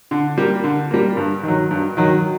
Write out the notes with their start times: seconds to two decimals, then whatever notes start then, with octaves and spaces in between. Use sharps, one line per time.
0.11 D3
0.38 G3 A#3
0.64 D3
0.91 G3 A#3
1.17 G2
1.43 D#3 F#3
1.71 G2
1.97 D#3 F#3